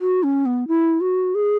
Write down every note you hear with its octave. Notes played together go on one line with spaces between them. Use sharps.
F#4
C#4
B3
E4
F#4
G#4